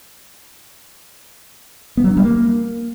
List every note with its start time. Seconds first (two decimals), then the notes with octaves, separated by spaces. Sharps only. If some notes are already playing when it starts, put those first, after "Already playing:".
1.97 B3
2.04 F#3
2.10 D4
2.17 G3
2.23 A#3